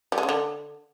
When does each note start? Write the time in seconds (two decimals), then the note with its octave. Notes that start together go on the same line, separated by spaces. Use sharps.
0.12 G3
0.18 G#3
0.23 C#3
0.29 D3